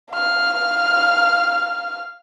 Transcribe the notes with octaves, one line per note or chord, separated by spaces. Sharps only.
F5 F6